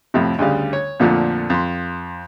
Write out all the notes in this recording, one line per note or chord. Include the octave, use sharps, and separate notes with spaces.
F2 A2 C3
D2 C#3 G3 F5
C#5
F2 A#2 D3 F3 A3
F2 C6